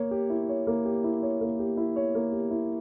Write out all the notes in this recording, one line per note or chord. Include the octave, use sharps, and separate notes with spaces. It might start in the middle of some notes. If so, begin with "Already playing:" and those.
Already playing: A#3 C#5
G4
E4
C#5
A#3
G4
E4
C#5
A#3
G4
E4
C#5
A#3
G4
E4